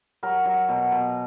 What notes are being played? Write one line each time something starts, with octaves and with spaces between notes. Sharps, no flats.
F#3 A#4
F#3
B2
B2